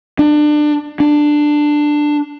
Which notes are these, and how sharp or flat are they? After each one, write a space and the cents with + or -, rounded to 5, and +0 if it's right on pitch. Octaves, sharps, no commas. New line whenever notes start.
D4 +25
D4 +10